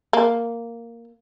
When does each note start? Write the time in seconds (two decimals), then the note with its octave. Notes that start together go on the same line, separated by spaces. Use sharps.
0.13 A#3